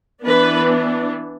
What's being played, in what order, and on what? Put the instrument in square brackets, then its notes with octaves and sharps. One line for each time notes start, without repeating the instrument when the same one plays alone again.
[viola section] E3 B3 D4 B4